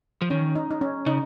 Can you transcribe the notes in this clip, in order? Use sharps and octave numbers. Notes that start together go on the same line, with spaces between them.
F3
D#3 C#4
D#4
D#4
C#4
C#3 D#4